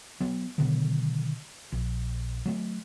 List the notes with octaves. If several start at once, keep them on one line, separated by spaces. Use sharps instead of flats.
F#3 B3
B2 D3 D#3 F#3
A#1
F#3 A3